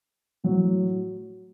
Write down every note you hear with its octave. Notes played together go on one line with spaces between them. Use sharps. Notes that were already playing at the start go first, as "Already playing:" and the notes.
A2 F#3